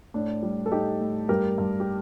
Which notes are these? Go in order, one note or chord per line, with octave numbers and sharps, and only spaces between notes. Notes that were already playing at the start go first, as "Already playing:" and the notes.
A2 D4
G3
A4
A2 D#4 G4
A2
G2 G4 A#4
G2
G4